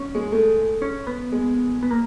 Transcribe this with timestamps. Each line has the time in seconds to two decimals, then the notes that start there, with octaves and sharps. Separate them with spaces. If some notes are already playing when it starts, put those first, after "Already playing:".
Already playing: C#4
0.15 G#3
0.32 A3
0.82 C#4
1.07 B3
1.32 G#3
1.83 B3
1.91 A#3